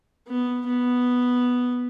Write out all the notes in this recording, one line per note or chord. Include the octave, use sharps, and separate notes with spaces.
B3
B3